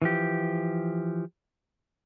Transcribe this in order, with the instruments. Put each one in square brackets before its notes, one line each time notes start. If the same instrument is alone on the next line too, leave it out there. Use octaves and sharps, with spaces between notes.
[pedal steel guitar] E3 F3 G4